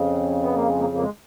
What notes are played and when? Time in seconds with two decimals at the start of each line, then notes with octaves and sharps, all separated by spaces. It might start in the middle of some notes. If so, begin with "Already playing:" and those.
Already playing: F2 C#3
0.43 B3
0.55 A#3
0.68 G#3
0.80 A#3
0.95 A#3
1.02 G#3